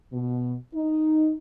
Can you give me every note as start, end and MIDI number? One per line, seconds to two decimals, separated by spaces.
0.13 0.55 47
0.74 1.35 63